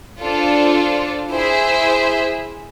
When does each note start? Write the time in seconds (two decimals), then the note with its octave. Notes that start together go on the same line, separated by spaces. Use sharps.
0.20 D4 F4 A4 C5
1.31 E4 G#4 C5 E5